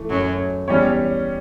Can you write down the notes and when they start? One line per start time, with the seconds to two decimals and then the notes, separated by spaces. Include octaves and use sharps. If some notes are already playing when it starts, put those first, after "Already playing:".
Already playing: E3 A3
0.10 F#2 F#3
0.68 E2 E3 G3 C#4 G4 C#5